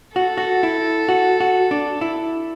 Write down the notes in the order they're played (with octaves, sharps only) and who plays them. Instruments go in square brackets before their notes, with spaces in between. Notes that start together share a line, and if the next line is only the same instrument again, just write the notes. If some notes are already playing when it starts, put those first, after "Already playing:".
[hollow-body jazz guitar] F#4 [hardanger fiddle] A4
[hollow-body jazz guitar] F#4
E4
F#4
F#4
D4
E4